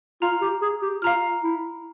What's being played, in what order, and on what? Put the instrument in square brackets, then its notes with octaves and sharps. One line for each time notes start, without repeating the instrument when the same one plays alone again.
[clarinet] F4 [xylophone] F5 A#5 F6
[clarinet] G4
G#4
G4
[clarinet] F4 [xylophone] F5 A#5 F6
[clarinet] E4